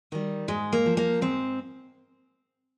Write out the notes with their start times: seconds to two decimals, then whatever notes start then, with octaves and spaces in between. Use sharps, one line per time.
0.12 D#3 G3
0.48 G#2 G#3
0.72 A#3
0.86 F3
0.97 A#3
1.21 G#2 C4